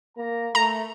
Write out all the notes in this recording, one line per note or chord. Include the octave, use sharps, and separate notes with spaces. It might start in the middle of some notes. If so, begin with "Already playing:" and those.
A#3 A#5
A3 A#5